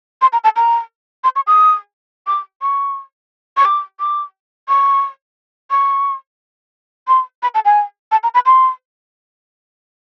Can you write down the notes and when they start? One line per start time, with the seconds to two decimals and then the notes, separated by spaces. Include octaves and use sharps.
0.22 C6
0.33 A#5
0.44 A5
0.56 A#5
1.24 C6
1.36 C#6
1.47 D#6
2.27 D6
2.62 C#6
3.57 C#6
3.65 D6
4.00 D6
4.68 C#6
5.71 C#6
7.08 C6
7.43 B5
7.55 A5
7.65 G#5
8.12 A5
8.23 A#5
8.34 B5
8.46 C6